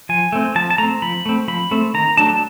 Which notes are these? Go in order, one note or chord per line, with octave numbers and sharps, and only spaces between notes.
F3 G#5
A3 C4
F3 A5
A5
A3 C4 A#5
F3 B5
A3 C4
F3 B5
A3 C4
D#3 A#5
F#3 A3 D4 A5